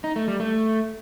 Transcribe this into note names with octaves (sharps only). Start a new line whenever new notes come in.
D#4
A3
G3
A3